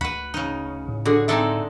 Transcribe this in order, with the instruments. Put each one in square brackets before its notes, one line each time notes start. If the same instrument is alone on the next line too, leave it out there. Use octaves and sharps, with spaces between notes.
[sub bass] D2 [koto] F#4 B4 [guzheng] B5
[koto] C#3 D#4
[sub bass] A2
[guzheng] D3 [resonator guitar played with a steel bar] F#4 G#4
[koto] G#3 A4 D5 [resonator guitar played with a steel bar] C4 D#4 E5